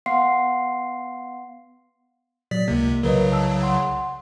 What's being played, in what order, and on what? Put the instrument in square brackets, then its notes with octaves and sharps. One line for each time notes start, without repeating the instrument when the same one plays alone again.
[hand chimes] B3 F5 F#5 C6 C7
[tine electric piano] A#2 F#3 [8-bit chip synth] D5 B6
[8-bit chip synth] C#2 C3 [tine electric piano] A#3
[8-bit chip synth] C2 C#3 F#3 [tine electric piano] A#4 B4 D#5
[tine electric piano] A5 E6
F#5 C6